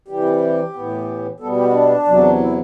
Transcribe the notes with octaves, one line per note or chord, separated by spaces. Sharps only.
C3 E3 G3 G4
A2 E3 B3
B2 G3 B3 A4
G4
F#4
D4
E2 C3 F#3
E4